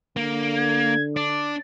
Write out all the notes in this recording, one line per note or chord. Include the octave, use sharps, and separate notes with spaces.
D3 A#3
G#6
D4 D6